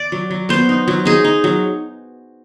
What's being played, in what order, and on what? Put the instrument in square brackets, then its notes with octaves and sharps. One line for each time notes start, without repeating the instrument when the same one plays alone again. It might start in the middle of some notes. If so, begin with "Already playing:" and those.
Already playing: [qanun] D5
F#3
F#3
B3 C5
D#4
F#3
D#4 G#4
D#4
F#3